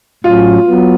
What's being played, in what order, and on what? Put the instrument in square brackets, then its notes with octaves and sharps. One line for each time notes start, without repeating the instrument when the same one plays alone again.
[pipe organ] A2 F#3 C#4 [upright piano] F4
[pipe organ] F#3 B3